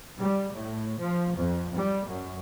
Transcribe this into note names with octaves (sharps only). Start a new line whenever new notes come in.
G3
A2
F3
F2
G3
F#2